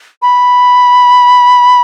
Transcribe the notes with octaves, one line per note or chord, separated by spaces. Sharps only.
B5